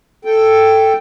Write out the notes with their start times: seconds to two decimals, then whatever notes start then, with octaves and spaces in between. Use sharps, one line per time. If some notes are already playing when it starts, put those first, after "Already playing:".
0.25 A4 G5